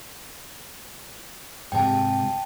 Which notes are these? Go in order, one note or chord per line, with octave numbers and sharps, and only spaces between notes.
G#2 C3 G5 A5